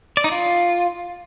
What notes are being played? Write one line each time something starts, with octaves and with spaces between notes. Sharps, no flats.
D5
D#4
F4